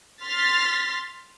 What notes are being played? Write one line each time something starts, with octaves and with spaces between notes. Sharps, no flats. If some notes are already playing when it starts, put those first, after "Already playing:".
C6 F6 A6 B6